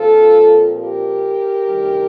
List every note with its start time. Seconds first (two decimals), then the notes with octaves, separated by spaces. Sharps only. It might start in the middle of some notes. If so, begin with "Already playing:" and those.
Already playing: A#2 F3 C4 F4 A4
0.76 G4 A#4
1.68 D2 C3 D#3 G3